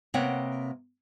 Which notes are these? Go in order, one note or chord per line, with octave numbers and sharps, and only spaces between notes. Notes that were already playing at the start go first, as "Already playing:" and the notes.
C3 A#3 B3 C#5 F#5 G5